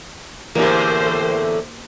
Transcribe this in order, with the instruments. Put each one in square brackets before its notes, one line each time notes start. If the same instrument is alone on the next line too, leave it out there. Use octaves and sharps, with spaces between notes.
[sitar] E2 A2 D3 [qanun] A#3 G4 [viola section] A#4 C5